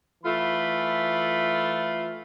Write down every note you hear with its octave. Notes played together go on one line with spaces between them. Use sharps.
E3 A3 F4 B5